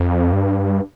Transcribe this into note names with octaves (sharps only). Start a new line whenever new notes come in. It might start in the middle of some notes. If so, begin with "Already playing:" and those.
Already playing: F2
G2